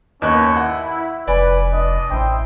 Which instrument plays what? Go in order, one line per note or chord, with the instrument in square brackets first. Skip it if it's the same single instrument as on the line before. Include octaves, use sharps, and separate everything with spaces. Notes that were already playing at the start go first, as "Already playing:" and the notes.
[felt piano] D#2 D#5 F#6 [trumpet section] B3 C#4 C#5
[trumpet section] E4 [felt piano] F#5
[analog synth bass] F1 [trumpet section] B4 [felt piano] D5 G#5
[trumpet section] D4 D#5
[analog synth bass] A1 [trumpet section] E4 C5 G5